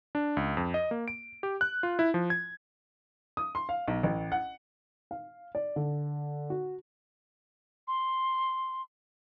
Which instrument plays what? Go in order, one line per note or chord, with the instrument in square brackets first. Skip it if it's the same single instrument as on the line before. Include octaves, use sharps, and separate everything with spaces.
[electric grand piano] D4
C#2
F2
D#5
A#3
D7
G4
F#6
F4
E4
F3
G#6
[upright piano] D#6
C6
F5
B1
A1
F#5
F5
D5
D3
F#4
[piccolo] C6